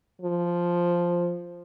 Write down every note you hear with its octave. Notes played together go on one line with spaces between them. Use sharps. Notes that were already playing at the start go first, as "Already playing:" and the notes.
F3